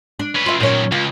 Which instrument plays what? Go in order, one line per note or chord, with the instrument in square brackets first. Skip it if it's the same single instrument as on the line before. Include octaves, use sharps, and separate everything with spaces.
[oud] D4
[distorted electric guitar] C#4 B4
[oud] F4 E5
[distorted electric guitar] F#2 D#3 [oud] A#2 C#4
[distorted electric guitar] C#2 [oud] F4